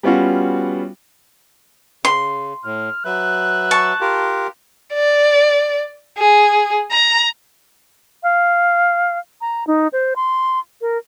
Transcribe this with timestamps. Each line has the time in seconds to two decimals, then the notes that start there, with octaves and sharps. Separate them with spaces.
0.03 G3 B3 C#4 F4 F#4
2.05 C#3 C6
2.65 A2 F6
3.05 F#3 B4 E5 F#6
3.71 A5 C#6
4.01 F4 G4 A#4
4.93 D5
6.18 G#4
6.91 A#5
8.23 F5
9.41 A#5
9.67 D#4
9.93 C5
10.16 C6
10.81 A#4